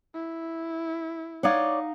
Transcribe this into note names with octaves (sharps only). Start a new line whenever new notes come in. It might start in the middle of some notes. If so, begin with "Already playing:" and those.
E4
D#4 C#5 D5 F5 F#5